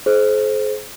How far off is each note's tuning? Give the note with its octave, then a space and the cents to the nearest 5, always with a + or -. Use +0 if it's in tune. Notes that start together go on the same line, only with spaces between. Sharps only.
G#4 +45 C5 +0